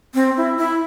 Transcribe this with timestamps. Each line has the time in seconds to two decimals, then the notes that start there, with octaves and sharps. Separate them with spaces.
0.15 C4
0.37 E4
0.58 E4